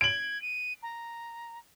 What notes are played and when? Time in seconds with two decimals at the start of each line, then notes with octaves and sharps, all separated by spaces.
0.01 G#6 D7 F#7
0.42 D#7
0.83 A#5